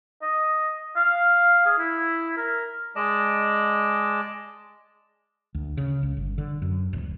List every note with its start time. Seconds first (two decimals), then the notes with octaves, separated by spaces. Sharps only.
0.22 D#5
0.96 F5
1.66 G#4
1.78 E4
2.37 A#4
2.96 G#3 D5 D#5 A5
5.55 D2
5.77 C#3
6.03 C#2
6.17 G1
6.38 D3
6.62 F#2
6.93 D1